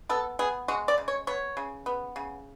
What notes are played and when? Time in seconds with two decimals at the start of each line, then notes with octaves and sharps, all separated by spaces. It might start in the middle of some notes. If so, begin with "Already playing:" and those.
0.09 B3 A4
0.39 B3 G#4
0.68 G#3 F#4
0.88 D5
0.98 C#3
1.08 C#5
1.27 B3 C#5
1.57 C#3
1.86 B3
2.16 C#3